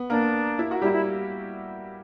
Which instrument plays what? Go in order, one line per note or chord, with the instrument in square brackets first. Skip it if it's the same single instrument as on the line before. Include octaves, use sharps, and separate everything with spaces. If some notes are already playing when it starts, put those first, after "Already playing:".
Already playing: [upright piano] B3
[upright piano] A#3 A#4 [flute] D4
[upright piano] E4
F#4
[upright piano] G3 G4 [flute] E4
[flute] E4